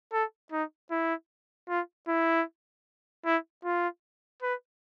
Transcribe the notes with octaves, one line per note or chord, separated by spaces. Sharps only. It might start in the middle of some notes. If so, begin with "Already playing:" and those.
A4
D#4
E4
F4
E4
E4
F4
B4